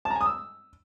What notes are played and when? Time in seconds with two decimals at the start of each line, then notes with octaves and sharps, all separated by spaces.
0.05 A5
0.10 A#5
0.15 G#5
0.21 D#6
0.26 E6